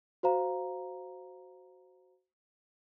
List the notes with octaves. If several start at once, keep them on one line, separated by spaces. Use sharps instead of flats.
F#4 C5 F5 A#5